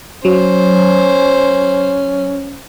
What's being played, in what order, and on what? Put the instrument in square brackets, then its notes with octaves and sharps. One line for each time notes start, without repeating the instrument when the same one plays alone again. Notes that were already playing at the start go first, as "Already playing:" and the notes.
[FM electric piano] F#3 [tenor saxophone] C#4 [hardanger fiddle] C5